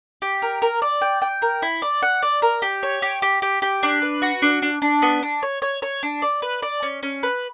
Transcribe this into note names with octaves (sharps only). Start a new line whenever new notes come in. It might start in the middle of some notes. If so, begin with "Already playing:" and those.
G4
A#4
A#4
D5
G5
G5
A#4
E4
D5
F#5
D5
A#4
G4
C#5
G4
G4
G4
G4
D4
B4
F#4
D4
D4
D4
B3
D4
C#5
C#5
C#5
D4
D5
B4
D5
C#4
C#4
B4